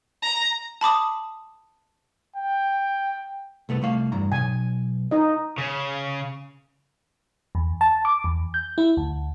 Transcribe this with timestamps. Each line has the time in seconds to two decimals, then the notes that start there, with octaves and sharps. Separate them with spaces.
0.22 A#5
0.81 A5 B5 D6 D#6
2.36 G5
3.69 C2 A3 B3
3.82 C2 A3 F5
4.12 E2 G2 A#5
4.32 B1 A#2 G#5
5.11 D#4 D#5
5.58 C#3
7.55 E2
7.81 A5
8.05 D6
8.24 E2
8.54 G6
8.78 E4
8.97 D2